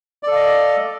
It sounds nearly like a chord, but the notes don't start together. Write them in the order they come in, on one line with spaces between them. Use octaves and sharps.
D5 A4 F5 D#5